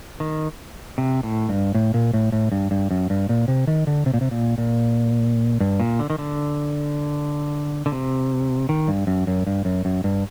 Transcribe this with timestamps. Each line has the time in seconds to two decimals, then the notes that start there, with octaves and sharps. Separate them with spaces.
0.20 D#3
0.98 C3
1.23 A2
1.49 G2
1.75 A2
1.94 A#2
2.13 A2
2.32 A2
2.52 G2
2.71 G2
2.91 F#2
3.10 G2
3.29 A#2
3.48 C3
3.67 D#3
3.87 D3
4.06 C3
4.14 A#2
4.21 C3
4.31 A#2
4.58 A#2
5.60 G2
5.80 A#2
5.99 D3
6.10 D#3
6.19 D3
7.86 D3
7.92 C3
8.69 D#3
8.88 G2
9.07 F#2
9.27 F#2
9.47 G2
9.65 F#2
9.85 F#2
10.04 G2